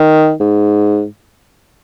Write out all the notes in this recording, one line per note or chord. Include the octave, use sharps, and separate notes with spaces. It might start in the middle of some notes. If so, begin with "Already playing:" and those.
Already playing: D#3
G#2